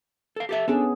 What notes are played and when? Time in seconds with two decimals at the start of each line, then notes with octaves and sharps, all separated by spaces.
0.36 A4 F5
0.49 G4 A4 E5
0.68 B3 C#4 D4 G#4 A4